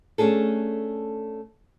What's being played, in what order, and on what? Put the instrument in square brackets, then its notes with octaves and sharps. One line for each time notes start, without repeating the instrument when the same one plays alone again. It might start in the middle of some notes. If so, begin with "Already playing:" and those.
[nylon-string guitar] A3 C#4 D4 G#4 A4